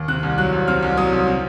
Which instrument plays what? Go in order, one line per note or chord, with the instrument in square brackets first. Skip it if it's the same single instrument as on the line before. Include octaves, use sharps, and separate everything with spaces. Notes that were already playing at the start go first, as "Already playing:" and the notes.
Already playing: [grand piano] D#2
C3 F#6
C2
F#3 F#6
C2
C3 F6
C2
F#3 D#6
C2
C3